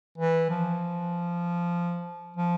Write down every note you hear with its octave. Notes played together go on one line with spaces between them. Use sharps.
E3
F3
F3